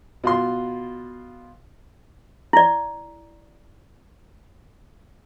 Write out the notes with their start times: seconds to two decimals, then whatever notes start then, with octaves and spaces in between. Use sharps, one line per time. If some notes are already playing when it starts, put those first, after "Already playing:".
0.24 B2 F4 C6
2.53 E4 D5